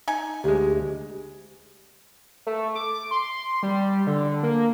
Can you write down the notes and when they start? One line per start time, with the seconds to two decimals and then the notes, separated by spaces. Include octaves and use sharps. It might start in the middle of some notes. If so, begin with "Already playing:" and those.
0.08 D#4 G#5
0.44 D2 G#3 G4
2.47 A3
2.75 D6
3.11 C6
3.63 G3
4.07 D3
4.43 A#3